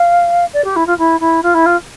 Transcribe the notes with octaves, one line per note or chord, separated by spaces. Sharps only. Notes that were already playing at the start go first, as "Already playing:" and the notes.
Already playing: F5
D5
G4
E4
F4
E4
E4
F4
E4
F4